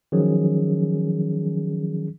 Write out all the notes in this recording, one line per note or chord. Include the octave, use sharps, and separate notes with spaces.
D#3 F3 F#3 C#4 G#4